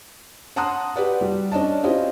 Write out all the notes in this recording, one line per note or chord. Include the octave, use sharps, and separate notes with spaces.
F#5 A5 A#5 C6 D#6 F#6
G4 B4 D5 F#5
G3
C#4 D4 D#5 A5
C4 C#4 E4 F4 G4 D#5